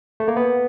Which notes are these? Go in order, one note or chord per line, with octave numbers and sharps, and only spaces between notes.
A3
A#3
B3